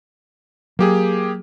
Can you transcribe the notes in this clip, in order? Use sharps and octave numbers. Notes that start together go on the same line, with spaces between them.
F#3 A#3 G4 G#4